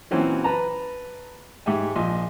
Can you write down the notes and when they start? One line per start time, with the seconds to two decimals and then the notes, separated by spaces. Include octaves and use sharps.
0.11 A#2 E3 F#3 C4 C#4 F#4
0.44 B4 A5 A#5
1.66 G#2 G4 E5 G#5
1.96 A#1 F3 D#5 C6